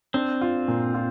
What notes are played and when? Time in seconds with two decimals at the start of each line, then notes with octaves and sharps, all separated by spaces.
0.14 C4 D4
0.41 F4
0.68 A#2
0.94 F4